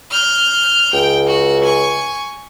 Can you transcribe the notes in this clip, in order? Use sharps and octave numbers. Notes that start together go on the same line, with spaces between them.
F6 G6
C#2 G5
F#4
G#5 C#6